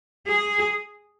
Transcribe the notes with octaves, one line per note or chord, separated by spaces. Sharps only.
G#4